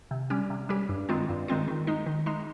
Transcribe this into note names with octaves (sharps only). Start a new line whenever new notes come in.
C3
G3 C#4 G4
C3
G3 C#4 G4
G2
D#3 G#3 C4 F4
G2
D#3 G#3 C4 F4
D#3
G#3 D#4
D#3
G#3 D#4